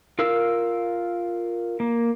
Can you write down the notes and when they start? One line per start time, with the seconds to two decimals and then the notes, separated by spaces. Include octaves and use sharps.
0.19 F4 A#4 F5 E6
1.80 A#3